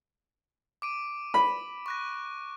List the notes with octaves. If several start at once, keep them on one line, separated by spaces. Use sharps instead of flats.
D6 D7 D#7
B5
C#6 F#6 A#6